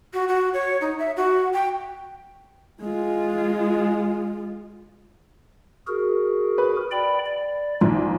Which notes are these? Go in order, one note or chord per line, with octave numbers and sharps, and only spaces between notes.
F#4
F#4
C#5
D#4
E5
F#4
G5
G#3 F4
F#4 G#4 A#4
B4
D5 G5 B5
D5
A#1 D#4 F4